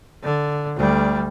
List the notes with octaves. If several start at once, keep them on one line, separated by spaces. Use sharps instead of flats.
D3
D2 G3